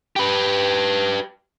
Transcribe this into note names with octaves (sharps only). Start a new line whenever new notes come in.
G4 B4